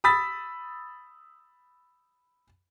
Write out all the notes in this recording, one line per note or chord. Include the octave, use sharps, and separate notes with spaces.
B5 D#6 E6 A6 B6